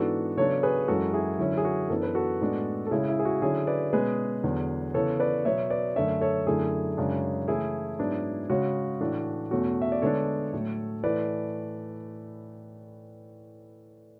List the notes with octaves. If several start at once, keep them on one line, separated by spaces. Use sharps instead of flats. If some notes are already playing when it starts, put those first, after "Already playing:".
Already playing: G#2 E3 B3 D4 F#4 A4
C#3 F#3 B3 D4 A4 C#5
G#4 B4
F#2 E3 G#3 C#4 F#4 A4
E4 G#4
F#2 D3 F#3 C#4 E4
G#4
F#4
F#2 E3 B3 D4 A4
B4
F#4 A4
A2 G#3 B3 D4
A4
C#3 G#3 C#4 E4 G#4
E4
G#4
F#4
D3 F#3 C#4 E4 G#4
B4 D5
B2 G#3 C#4 G#4 B4
E2 D3 F#3
C#3 E3 B3 A4 C#5
B4 D5
B2 F#3 B3 C#5 E5
B4 D5
F#2 D3 A3 C#4 C#5 E5
A4 C#5
F#2 D3 A3 E4 G#4
F#2 C#3 G#3 D4
C#3 E3 A3 E4 G#4
G#2 F#3 B3 D4
C#3 G#3 C#4 F#4
A2 E3 A3 D4
E2 B2 A3 C#4 F#4
E5
D5
D3 G#3 B3 D4 A4 C#5
A2 F#3 A3
A2 E3 A3 B4 D5